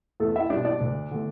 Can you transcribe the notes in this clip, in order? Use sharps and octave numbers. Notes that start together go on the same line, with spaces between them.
E2 A3 A4
E4 E5
B2 G3 D4 D5
D4 D5
D2
D3 A3